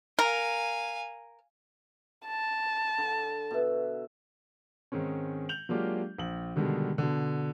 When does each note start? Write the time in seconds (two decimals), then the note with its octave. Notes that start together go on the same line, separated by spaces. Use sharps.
0.19 A#4 F5 G#5
2.26 A5
2.98 D3
3.51 B2 E5
4.92 G#2 D#3 G#3 C4 C#4
5.49 G6 F7 F#7
5.69 F#3 G#3 A#3 D4 F4 G4
6.18 A#1 F#7
6.56 B2 D3 D#3 G3 G#3
6.98 B2 D3